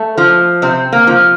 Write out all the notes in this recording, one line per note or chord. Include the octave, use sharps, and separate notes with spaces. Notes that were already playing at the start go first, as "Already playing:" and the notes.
Already playing: A3
F3
C3 C4
A#3
F3